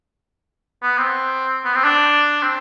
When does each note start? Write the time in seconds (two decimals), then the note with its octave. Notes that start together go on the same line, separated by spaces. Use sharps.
0.83 B3
0.98 C4
1.65 B3
1.75 C4
1.84 D4
2.43 C4